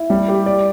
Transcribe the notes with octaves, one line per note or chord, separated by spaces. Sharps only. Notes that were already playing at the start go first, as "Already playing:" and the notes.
Already playing: E4
G3
G4
D5